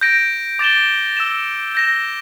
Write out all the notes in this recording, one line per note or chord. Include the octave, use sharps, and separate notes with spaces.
G6 A#6 D7
D6 A6 E7 G7
E6 A6 E7
G6 A#6 E7